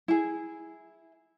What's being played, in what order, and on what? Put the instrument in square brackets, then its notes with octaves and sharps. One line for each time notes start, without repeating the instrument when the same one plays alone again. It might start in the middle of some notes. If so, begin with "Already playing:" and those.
[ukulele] E4 G#4